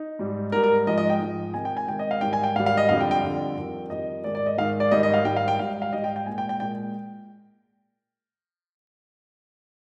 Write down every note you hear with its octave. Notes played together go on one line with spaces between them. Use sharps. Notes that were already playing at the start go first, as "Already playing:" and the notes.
Already playing: D#4
G#2 G3
G#2 G3 A#4
A#4
G#2 F3 G#3 D#5
D#5
G5
G#2 F3 G#3
C3 D#3 G#3 G#5
G5
G#5
C3 D#3 G#3 G5
D#5
F5
G#2 D#3 G3 G5
G#5
G5
G#2 D#3 G3 F5
F5
D#5
F2 D3 G3 F5
G5
G5
F2 D3 G3
F2 D#3 G3
F2 D#3 G3 D#5
G#2 D#3 G#3 D5
D5
D#5
G#2 D#3 G#3 F5
D5
G#2 D#3 G3 D#5
D#5
F5
G#2 D#3 G3 G5
F5
G5
G#2 G3 F5
F5
G#2 G3 D#5
G5
G5
A#2 G#3 G#5
G5
G5
A#2 G#3 G5